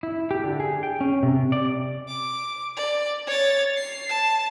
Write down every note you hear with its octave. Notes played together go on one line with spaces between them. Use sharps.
E4
G4
D3
G#4
G5
C#4
C3
D5
D6
D5
C#5 A6
C7
A5